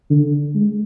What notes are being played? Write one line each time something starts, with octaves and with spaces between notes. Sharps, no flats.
D3
G#3